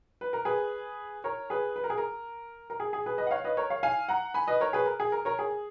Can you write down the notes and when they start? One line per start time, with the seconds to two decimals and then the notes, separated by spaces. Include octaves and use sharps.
0.21 B4
0.33 A#4
0.45 G#4 B4
1.24 A#4 C#5
1.50 G#4 B4
1.76 B4
1.84 A#4
1.90 G#4
1.98 A#4
2.70 A#4
2.80 G#4
2.93 G#4
3.06 G#4 B4
3.18 B4 D#5
3.27 F#5
3.31 C#5 F5
3.44 B4 D#5
3.57 A#4 C#5
3.70 C#5 F5
3.83 F5 G#5
4.09 F#5 A#5
4.34 G#5 B5
4.48 B4 D#5
4.61 A#4 C#5
4.73 G#4 B4
4.86 A#4
5.00 G#4
5.12 A#4
5.25 A#4 C#5
5.39 G#4